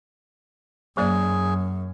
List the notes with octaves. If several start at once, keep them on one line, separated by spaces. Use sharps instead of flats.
F#2 F#3 A#3 G#4 D5